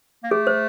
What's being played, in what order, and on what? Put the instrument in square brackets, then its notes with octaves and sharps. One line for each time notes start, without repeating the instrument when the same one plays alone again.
[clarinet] A#3
[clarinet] A3 [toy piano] G#4
[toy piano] C5